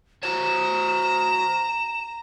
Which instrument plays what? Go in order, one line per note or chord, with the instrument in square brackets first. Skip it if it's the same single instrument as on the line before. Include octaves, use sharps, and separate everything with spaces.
[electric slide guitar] F#4 C5 C#5 [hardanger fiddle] A#5 [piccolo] E7